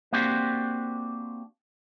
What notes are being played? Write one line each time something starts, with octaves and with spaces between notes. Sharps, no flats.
A#3 C4 D4 F#4 G4 C5